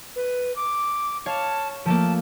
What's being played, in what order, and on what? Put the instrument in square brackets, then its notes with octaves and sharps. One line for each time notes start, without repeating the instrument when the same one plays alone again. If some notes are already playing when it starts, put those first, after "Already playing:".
[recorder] B4
D6
[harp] C#5 F5 [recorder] A5
[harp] F3 A3 A#3 [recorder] A5